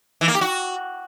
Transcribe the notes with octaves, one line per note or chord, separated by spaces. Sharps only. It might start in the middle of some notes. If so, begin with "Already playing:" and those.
E3
A#3
G4
F#4